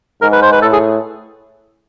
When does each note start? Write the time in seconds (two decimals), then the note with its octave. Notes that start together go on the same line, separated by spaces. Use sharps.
0.22 G#2 A#4
0.33 B4
0.42 C5
0.52 B4
0.62 A2 A4
0.73 G#4